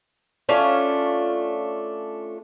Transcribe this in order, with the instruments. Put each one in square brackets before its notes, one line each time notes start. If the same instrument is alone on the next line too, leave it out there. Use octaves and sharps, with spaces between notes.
[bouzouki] A3 C#4 D4 F4